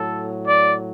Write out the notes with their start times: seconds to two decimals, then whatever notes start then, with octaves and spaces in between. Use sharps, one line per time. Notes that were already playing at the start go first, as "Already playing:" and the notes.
Already playing: A2 F#3 A4
0.47 D5